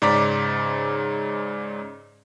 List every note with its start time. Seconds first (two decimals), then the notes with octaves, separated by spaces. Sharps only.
0.02 G#2 C#3 D5 A#5 D6 B6